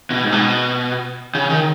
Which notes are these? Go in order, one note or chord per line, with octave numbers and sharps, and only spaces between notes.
B2
G#2
B2
C#3
D#3